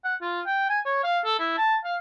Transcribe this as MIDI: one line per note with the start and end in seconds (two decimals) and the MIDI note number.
0.04 0.15 78
0.21 0.41 65
0.46 0.67 79
0.69 0.80 80
0.85 1.02 73
1.04 1.18 77
1.25 1.34 69
1.39 1.56 64
1.57 1.76 81
1.84 1.96 77